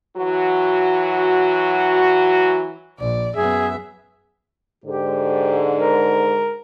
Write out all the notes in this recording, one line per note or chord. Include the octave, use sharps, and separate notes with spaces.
E3 F#3 F#4
A#1 D5
F#2 B3 G#4 E5
G#2 D3 G4
A#4